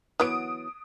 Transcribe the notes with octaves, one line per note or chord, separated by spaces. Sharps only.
E3 F#3 B3 D#6 D7